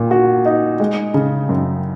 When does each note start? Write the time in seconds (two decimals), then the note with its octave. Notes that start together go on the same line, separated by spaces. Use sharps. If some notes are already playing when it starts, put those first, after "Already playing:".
Already playing: A#2
0.11 F#4
0.46 D#4
0.80 G#3
1.14 C#3
1.49 F#2